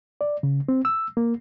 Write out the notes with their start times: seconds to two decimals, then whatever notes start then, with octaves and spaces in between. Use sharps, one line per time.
0.21 D5
0.43 C#3
0.69 C4
0.85 E6
1.17 A#3